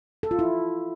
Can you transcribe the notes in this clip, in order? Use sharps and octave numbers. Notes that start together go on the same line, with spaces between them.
A4
F4
E4